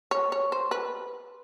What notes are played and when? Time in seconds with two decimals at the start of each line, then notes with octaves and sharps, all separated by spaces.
0.11 C#5
0.32 C#5
0.52 C5
0.71 B4